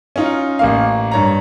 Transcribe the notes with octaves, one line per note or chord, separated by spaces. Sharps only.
C#4 D#4 F4
A1 A#3 F5
G2 C#5 A#5